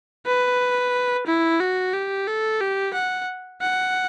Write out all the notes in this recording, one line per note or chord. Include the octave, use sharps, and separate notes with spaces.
B4
E4
F#4
G4
A4
G4
F#5
F#5